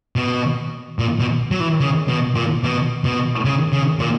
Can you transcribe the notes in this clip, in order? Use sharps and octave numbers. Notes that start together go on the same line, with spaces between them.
B2
A#2
B2
F#3
E3
C#3
B2
A#2
B2
B2
C#3
C#3
A#2